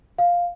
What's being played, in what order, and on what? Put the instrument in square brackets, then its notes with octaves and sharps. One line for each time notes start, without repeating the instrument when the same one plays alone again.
[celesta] F5